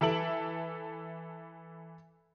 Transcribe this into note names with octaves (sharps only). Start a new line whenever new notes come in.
E3 A4 E5 A5 D7 F#7